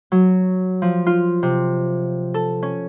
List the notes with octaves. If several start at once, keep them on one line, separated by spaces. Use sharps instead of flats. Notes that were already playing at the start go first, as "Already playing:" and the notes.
F#3
F3
F4
C3
A4
C#4